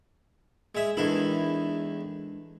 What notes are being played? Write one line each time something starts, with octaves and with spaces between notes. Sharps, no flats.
G#3 E5
E2 D#3 G#3 D4 E4 A4